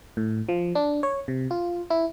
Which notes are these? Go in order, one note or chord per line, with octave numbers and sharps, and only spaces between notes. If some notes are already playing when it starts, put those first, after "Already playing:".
A2
F3
D4
C#5
C3
F4
E4